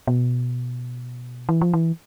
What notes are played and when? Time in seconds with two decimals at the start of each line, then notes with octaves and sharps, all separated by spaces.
0.07 B2
1.49 E3
1.61 F3
1.74 E3